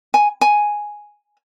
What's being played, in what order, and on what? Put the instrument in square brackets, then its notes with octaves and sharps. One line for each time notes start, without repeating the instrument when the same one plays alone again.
[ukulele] G#5
G#5